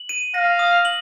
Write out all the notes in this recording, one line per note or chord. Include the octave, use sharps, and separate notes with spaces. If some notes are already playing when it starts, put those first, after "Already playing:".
Already playing: F#7
D#7
F5 A#6
D#6
F#7